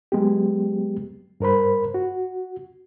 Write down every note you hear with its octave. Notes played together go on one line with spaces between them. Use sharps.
F#3 G#3 B3 G4
G2 A#4 C5 B5
F#4